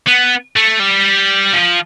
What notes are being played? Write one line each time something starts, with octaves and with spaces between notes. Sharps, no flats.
B3
A3
G3
F3